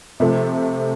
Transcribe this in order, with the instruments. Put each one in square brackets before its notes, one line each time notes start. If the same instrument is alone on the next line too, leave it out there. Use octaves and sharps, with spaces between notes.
[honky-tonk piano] C3 F3 A3